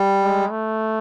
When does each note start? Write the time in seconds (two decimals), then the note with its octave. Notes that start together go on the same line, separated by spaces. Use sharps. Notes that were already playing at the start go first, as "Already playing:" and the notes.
Already playing: G3
0.22 G#3
0.51 A3